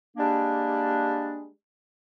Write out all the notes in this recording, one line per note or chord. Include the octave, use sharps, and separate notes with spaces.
G3 G#3 A#3 D4